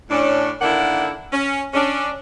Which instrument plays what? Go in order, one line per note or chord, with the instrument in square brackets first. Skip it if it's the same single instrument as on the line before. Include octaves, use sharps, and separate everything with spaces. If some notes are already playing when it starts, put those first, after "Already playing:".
[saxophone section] A2 C#4 D4
D3 D#3 A#3 D4 E4 F#5
C#4
C#4 D4